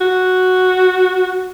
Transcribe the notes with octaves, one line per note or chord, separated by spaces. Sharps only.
F#4